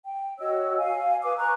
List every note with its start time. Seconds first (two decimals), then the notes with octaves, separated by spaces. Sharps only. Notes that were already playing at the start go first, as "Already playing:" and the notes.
0.05 G5
0.40 F#4 C#5 D#5 E6
0.78 F5 G#5
1.23 B4 G#5 D6 D#6
1.38 G#5 A#5 C#6 F#6